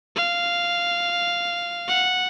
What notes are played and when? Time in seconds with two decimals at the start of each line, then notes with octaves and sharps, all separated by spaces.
0.16 F5
1.88 F#5